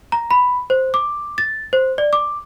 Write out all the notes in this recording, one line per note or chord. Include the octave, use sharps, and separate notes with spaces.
A#5
B5
C5
D6
A6
C5
D5
D6